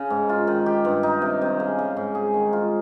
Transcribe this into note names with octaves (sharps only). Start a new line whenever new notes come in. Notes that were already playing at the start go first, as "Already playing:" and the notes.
Already playing: C#3
G#2
F4
D#3
G4
G2
D#4
C3
C3
C#3
C#3
G#2
G#4
D#3
F4